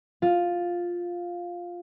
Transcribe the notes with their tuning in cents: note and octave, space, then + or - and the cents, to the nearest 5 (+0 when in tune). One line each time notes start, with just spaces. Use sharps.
F4 +5